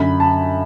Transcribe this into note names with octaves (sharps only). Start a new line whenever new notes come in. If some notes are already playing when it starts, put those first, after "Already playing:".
Already playing: F#2 D3 B5
A5